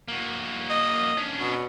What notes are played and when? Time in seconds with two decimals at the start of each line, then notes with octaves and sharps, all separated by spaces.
0.08 A#3 F#4
0.70 D#5
1.17 C#4 D4
1.38 B2